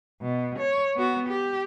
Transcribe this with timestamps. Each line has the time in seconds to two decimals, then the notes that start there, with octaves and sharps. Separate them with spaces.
0.21 B2
0.59 C#5
0.95 B3 F#4
1.29 G4